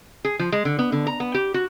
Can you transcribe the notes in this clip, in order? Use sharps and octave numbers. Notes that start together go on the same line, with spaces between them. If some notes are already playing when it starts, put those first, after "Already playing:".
G#4
F3
G#3
D3
B3
D3
A#5
B3
G4
F#4